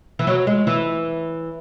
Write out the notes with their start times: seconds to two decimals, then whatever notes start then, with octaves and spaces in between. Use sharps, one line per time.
0.19 E3
0.27 F#3
0.47 G#3
0.67 E3